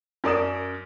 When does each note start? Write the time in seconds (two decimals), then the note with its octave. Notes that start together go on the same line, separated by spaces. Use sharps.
0.24 F#2 A#4 D5 D#6 E7